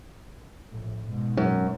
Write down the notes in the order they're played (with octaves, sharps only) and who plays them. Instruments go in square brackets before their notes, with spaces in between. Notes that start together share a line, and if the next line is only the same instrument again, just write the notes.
[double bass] A#1 A2
G#2 B2
[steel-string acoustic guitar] F#2